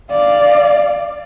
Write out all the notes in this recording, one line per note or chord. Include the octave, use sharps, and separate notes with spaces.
D5 F5